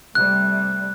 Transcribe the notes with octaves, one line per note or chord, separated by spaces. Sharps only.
C3 G3 A3 F#6